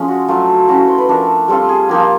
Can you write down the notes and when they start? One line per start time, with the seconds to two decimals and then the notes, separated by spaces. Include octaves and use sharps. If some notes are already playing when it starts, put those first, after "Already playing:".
Already playing: F3 G#3 C#4
0.08 F#4
0.28 F#3 A3 D4 F4
0.68 A3 C#4 E4 F#4
0.78 F#4
0.88 C5
0.98 B4
1.09 F3 A3 D4 A#4
1.48 G3 C4 F4 A4
1.69 G#4
1.89 F3 A#3 D#4 G4
2.00 F4